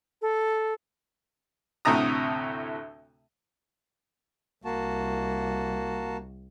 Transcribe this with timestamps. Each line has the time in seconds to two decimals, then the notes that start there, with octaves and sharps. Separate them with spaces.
0.22 A4
1.85 D2 A2 C3 A3 A#5 D#6
4.65 C2 A#3 F#4 A5